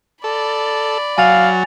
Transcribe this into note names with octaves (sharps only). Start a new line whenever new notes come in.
A4 D5 B5
F#3 F5 G#5 A6 F7